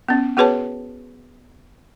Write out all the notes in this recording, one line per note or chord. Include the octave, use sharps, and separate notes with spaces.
B3 C#4
B3 F#4 G#4 B4 C#5 A5